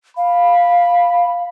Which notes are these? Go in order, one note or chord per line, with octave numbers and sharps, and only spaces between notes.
F5 B5